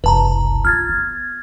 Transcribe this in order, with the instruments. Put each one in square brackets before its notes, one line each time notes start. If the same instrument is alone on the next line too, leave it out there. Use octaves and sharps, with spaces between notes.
[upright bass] F#1 C2 [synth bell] B4 A5 A#5
[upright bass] F4 [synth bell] F6 G#6 A6
[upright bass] B3